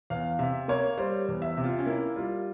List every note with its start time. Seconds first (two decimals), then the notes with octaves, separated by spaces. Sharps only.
0.10 E2 F5
0.39 C3 E5
0.68 A#3 C#5
0.98 G3 C5
1.28 E2
1.42 E5
1.57 C3
1.64 F4
1.79 C#4
1.87 A#3 E4
2.16 G3 F4